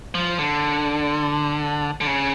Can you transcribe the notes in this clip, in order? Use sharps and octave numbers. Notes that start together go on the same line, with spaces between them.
F3
D3
D3
C#3